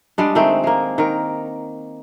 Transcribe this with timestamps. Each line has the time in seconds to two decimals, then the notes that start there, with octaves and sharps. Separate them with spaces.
0.18 G3 G#3 D4
0.35 D#3 G#3 A3 C4
0.64 G#3 A#3
0.98 D#3 A#4